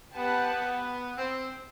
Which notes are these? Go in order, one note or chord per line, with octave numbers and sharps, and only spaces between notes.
B3 G4 B4 F#5 A5
B3
C4